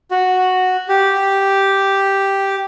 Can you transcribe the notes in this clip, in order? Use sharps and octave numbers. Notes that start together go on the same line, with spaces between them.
F#4
G4